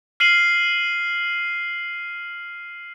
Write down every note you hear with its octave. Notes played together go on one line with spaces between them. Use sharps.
F6 C7 D#7 F#7